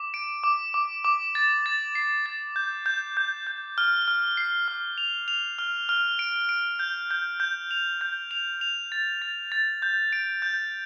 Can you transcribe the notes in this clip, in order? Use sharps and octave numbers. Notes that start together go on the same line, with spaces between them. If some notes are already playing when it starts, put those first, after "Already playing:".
Already playing: D6
D7
D6
D6
D6
A6
A6
C7
A6
G6
G6
G6
G6
F6
F6
C7
F6
F7
F7
F6
F6
D7
D7
G6
G6
G6
F7
G6
F7
F7
A6
A6
A6
G6
D7
G6